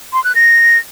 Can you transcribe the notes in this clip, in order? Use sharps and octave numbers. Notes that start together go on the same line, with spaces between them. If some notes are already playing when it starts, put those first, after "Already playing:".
C6
F#6
A#6